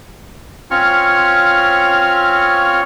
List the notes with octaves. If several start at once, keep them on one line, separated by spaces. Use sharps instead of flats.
C4 C#4 F4 C#5 C#6 F6